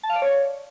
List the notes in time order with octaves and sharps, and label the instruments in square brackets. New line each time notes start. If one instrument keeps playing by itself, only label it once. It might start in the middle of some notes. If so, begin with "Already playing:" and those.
[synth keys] A5
F5
D5
C#5